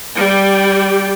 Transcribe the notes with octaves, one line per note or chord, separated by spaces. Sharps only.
G3 G4